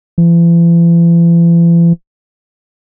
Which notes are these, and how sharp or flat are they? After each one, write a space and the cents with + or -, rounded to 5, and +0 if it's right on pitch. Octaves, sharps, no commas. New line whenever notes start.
E3 +45